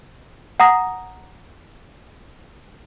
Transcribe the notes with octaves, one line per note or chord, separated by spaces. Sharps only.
F#5 A#5 D#6 A#6